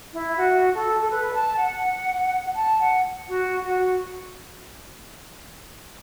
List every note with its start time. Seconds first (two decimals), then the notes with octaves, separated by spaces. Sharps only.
0.13 E4
0.37 F#4
0.73 A4
1.00 A4
1.10 B4
1.33 A5
1.57 F#5
2.55 A5
2.79 F#5
3.27 F#4
3.63 F#4